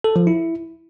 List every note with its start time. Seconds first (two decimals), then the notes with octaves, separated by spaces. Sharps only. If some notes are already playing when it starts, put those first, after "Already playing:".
0.04 A4
0.16 F3
0.27 E4